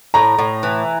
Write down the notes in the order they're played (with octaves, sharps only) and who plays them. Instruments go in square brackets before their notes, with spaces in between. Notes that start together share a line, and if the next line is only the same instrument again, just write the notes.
[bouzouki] A2 [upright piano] A#5
[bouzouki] A2
E3